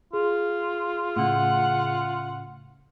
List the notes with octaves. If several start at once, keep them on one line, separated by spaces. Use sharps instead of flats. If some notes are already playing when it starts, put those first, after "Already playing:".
F4 G#4
A2 C#3 F#5